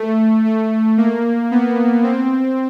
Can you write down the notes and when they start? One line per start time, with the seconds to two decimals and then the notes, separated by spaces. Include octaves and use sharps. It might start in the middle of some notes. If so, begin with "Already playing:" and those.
Already playing: A3
0.45 A3
0.98 A#3
1.51 B3
2.03 C4